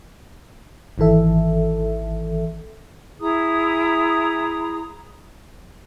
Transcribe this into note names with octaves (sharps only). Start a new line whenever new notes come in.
G#1 D#3 E3 A4 E5
E4 G#4 A#5 D#6